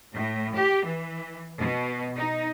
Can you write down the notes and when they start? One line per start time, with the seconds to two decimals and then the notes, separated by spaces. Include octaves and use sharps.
0.14 A2
0.56 G4
0.86 E3
1.58 B2
2.17 D#4